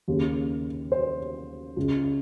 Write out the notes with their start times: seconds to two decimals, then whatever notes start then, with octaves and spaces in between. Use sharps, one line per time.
0.08 D#2 C#3
0.92 C5
1.76 C#2 C#3